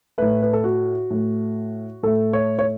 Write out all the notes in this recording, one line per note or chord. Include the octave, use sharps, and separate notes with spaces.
A2 A3 B4
B4
A4
F#4
A2 A3
A2 A3 A4
C#5
C#5